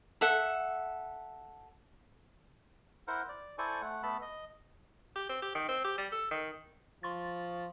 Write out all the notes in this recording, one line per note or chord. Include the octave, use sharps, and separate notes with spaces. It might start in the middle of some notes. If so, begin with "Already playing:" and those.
A4 E5 F#5
E4 A#4 C5 F#5
D5
E4 A4 C5 D5 G#5 C#6
A3 F#5
A3 B3 A4 A5 B5
D#5
G4
C4
G4
D#3
C4
G4
G3
A4
D#3
F3 C6 C#6 A6